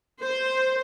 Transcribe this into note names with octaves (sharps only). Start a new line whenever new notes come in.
C5